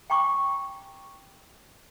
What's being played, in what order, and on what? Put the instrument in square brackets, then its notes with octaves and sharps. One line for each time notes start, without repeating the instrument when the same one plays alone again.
[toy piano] G5 G#5 A#5 C#6 D6